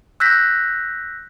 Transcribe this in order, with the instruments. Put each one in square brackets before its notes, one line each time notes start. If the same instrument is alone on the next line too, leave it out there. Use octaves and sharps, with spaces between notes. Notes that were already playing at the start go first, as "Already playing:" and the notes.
[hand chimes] E6 F#6 G6 A#6 B6